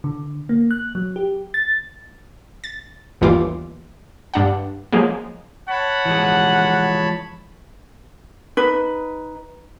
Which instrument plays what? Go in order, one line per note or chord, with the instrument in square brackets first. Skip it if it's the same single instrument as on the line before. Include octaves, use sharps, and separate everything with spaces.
[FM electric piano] D3
A#3
F#6
F#3
G4
A6
[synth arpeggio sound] A6
G1 D#2 E3 G3 F4 D6
G2 D4 F#5
F3 F#3 G#3 A#3
[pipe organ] C#5 A5 B5 [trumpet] F#5
[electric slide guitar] E3 F3 G#3
[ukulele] D#4 B4